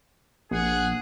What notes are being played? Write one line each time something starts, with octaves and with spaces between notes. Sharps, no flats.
A#1 G#4 F#5